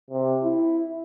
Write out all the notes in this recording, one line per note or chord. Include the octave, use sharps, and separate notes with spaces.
C3
E4